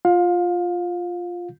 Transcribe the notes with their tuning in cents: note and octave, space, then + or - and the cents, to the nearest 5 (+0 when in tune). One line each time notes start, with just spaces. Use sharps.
F4 +0 F5 +25